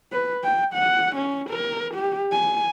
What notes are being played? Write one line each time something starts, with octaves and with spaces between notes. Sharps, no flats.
B4
G5
F#5
C#4
A#4
G4
G#5